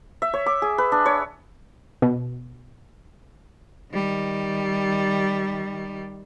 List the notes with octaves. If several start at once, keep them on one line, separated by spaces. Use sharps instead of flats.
E5
C#5
D6
G#4
B4
D4
C#5
B2
D#3 G3